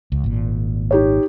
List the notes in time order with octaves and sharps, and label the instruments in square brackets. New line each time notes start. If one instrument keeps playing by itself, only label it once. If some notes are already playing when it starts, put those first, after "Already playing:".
[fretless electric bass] C#2
G#1 A#2
[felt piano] D#4 G4 C#5